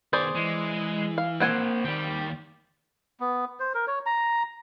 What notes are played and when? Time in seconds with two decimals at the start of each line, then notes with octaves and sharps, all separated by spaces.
0.13 D#3 B3 G#4 C5 D5
0.35 E3 G#3
1.18 F5
1.40 A#3 C4 C5 F#5 G#5
1.85 D#2 D#3 D5 G5
3.20 B3
3.60 C5
3.74 A#4
3.87 C#5
4.06 A#5